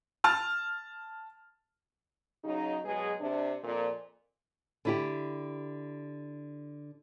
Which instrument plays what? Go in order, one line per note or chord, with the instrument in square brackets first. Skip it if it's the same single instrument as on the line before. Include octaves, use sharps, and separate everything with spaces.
[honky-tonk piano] A5 F6
[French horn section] C#3 F#3 D#4
B2 F#3 G#3 G#4
C3 D4
F2 A#2
[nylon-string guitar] D3 E4 G4